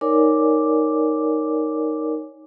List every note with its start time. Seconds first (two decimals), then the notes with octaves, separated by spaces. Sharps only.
0.01 D#4 A#4 C#5 D5 G#5 D6